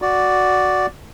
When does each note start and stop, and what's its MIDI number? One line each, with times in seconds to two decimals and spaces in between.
0.02 0.86 66
0.02 0.86 74